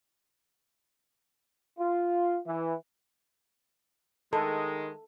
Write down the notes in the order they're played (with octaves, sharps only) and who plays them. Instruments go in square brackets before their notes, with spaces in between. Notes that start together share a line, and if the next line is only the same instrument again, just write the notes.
[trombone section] F4
E3
[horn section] D#3 G#3 [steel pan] A4